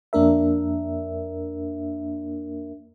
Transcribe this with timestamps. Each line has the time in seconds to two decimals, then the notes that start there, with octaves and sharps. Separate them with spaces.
0.13 F2 A#3 D4 A#4 E5